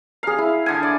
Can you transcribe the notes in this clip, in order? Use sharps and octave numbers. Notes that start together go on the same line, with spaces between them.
G#4 F5 A#5
E4
D3 G#5
D5